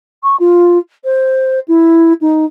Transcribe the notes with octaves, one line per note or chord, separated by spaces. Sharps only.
C#6
F4
C5
E4
D#4